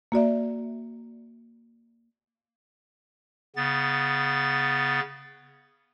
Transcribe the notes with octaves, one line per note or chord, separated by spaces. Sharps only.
A#3 F#4 D5 E5
C#3 B3 A6